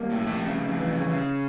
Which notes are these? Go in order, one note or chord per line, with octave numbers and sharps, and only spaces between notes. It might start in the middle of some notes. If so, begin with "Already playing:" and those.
Already playing: G3 A#3
A2
F2 A3
C#3
F2
E3
C#3
C#3